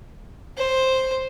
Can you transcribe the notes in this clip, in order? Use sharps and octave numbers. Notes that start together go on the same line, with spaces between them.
C5